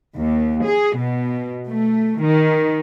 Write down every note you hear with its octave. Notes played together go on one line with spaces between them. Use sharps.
D#2
G#4
B2
A3
D#3